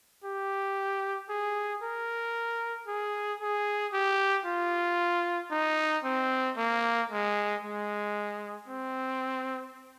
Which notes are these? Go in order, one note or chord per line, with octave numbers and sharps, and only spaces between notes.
G4
G#4
A#4
G#4
G#4
G4
F4
D#4
C4
A#3
G#3
G#3
C4